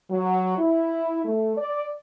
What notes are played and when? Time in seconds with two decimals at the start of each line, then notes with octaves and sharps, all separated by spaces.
0.11 F#3
0.58 E4
1.24 A3
1.57 D5